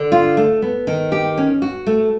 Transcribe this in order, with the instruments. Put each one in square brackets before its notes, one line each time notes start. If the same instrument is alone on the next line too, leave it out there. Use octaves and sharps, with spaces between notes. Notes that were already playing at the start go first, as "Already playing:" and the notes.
Already playing: [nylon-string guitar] D3
F4
A3
B3
D#3
G4
C#4
F#4
A3